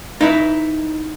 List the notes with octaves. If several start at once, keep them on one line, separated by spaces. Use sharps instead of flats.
D#4 E4 B4